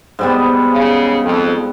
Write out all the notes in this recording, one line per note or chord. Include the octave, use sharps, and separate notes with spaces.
G#2 G3 B3
C#3
F2